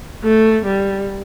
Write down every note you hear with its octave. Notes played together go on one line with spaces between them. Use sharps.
A3
G3